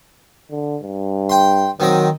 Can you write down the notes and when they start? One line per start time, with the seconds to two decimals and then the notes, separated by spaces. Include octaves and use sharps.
0.51 D3
0.82 G2
1.29 G5 C6
1.80 D#3 F#3 C4 D#5